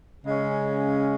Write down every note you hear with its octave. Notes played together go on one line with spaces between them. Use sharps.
C#3 G#3 C#4